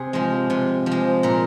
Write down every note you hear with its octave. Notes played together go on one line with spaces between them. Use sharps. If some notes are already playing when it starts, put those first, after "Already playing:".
Already playing: C3 G#4
F3 G#3
C3
F3
G#3
A#2 A#4